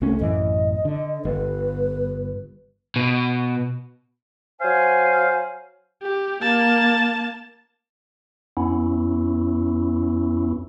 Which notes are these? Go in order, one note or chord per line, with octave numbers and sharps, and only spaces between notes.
C2 A3 C#4
A1 F#2 E3 D#5
D3
G1 B4
B2
F#3 C5 F5 G#5
G4
A#3 A5
F2 B3 C#4 E4